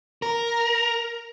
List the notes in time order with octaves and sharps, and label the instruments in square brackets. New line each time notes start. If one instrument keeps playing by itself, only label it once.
[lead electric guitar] A#4